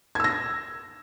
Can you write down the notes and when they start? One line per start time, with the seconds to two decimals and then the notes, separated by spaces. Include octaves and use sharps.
0.15 G#6
0.20 E6
0.24 A#6